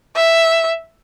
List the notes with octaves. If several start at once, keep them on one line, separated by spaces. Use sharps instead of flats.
E5